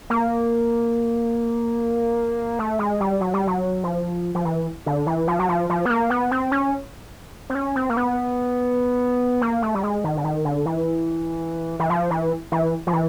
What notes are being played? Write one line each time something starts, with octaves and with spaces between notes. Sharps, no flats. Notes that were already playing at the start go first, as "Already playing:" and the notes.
A#3
A3
G#3
G3
F#3
G3
F#3
F3
F3
E3
D3
E3
F3
F#3
F3
F3
B3
A#3
B3
C4
C#4
C4
C#4
C4
A#3
B3
A#3
A3
G3
G#3
D#3
D3
D#3
D3
E3
E3
F3
E3
E3
F3
E3